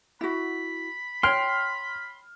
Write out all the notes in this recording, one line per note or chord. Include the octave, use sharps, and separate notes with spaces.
E4 F#4 B5
C#5 G5 C6 F6